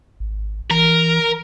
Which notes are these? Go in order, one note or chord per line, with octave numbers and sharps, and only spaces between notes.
G#1
E3 A#4